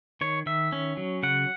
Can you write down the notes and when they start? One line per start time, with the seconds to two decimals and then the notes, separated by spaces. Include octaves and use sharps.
0.21 D#3 C#5
0.46 D#3 E5
0.72 C#4
0.97 F#3
1.23 C#3 F#5